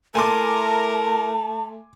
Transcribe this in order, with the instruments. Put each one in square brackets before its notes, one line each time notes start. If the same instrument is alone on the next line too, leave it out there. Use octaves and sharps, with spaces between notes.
[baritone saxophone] A3 [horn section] E4 A#4 [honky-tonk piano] G#5 C6 D6 [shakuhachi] A5